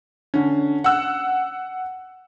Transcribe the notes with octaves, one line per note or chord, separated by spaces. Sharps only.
D3 C#4
F#5 E6 F#6